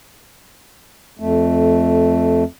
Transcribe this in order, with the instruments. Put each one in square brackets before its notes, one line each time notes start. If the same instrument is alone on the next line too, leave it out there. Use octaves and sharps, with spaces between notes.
[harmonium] F2 A3